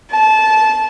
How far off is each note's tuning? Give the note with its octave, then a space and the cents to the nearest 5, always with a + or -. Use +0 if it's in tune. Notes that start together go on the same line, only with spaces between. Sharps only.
A5 -20